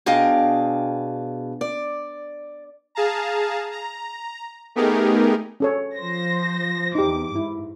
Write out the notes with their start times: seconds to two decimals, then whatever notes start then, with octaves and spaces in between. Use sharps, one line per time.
0.06 B2 D4 G#4 D#5 F5 G5
1.61 D5
2.95 G#4 F5 A5 A#5
3.72 A#5
4.75 A3 B3 D#4 G4 G#4 A#4
5.60 C#4 A4 C#5
5.96 F3 C5 A#6
6.95 E2 D#4 G4 D6
7.35 G#2 E4